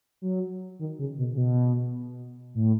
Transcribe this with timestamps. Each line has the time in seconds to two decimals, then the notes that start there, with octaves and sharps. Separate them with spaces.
0.22 F#3
0.79 D#3
0.99 C#3
1.18 B2
1.33 C#3
1.38 B2
2.55 A2